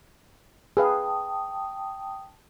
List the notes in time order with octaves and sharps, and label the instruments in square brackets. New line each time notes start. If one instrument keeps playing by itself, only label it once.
[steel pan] G#4 B4 F5 [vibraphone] G5 A5 D#6